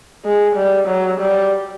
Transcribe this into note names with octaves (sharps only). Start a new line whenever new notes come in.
G#3
G3
F#3
G3